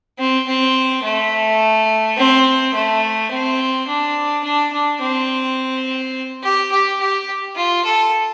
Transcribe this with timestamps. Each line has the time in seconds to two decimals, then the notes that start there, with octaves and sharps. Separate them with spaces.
0.19 C4
0.47 C4
1.04 A3
2.17 C4
2.74 A3
3.31 C4
3.87 D4
4.44 D4
4.73 D4
5.01 C4
6.43 G4
6.71 G4
7.00 G4
7.56 F4
7.84 A4